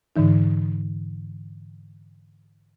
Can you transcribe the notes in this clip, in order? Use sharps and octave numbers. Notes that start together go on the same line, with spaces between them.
G#2 D3 E3 D#4